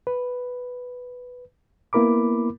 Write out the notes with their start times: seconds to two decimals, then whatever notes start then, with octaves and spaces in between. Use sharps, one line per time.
0.07 B4
1.93 A#3 B3 E4 A#4 B5 D6